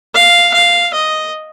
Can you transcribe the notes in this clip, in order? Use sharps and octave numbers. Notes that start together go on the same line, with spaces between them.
F5
F5
D#5